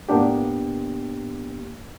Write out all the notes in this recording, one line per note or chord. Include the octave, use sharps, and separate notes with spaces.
A2 A#3 B3 D4 G4